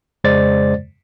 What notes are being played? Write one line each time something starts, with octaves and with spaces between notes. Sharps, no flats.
F2 C#3 G#3 C5 D5 A6